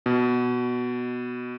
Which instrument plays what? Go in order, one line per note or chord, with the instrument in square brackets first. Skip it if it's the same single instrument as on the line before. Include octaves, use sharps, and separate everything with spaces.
[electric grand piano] B2